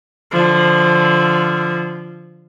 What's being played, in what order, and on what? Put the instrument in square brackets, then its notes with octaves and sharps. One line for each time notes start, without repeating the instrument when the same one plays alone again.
[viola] D3 F3